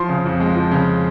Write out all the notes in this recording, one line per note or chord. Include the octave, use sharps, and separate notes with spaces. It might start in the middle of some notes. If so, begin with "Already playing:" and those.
Already playing: F3 C6
C#3
F2
G#3
F3
C#3